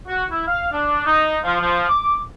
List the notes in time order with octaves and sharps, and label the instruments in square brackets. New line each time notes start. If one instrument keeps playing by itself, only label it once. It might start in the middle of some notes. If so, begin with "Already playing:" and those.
[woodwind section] F#4
E4
F5
D4
D#4
F3
F3
D6